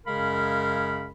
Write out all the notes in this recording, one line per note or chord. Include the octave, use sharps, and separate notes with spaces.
F#2 C#3 G#3 A#4 F5 B5